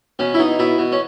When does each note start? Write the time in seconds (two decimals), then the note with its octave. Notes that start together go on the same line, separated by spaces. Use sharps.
0.19 B2 C#4
0.34 E4
0.39 B2 D#4
0.59 B2 E4
0.78 B2
0.92 C#4